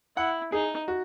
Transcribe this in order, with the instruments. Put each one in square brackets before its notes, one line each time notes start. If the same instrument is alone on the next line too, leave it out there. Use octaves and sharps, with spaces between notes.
[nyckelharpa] E4 [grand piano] F#5
[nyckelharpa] D#4 [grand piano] G#4
[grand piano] F#4